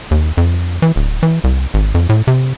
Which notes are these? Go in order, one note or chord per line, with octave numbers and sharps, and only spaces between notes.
D#2
F2
E3
D1
E3
C2
G#1
F2
A2
C3